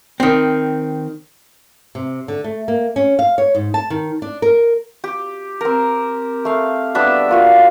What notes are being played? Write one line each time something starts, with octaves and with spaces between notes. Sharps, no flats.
D#3 C4
C3
D3
A3
A#3
C#4
F5
C#5
G#2
A5
D#3
D4
A#4
G4
C4 A#4
A3 F5
G3 B3 D4 E5
A#3 F4 F#4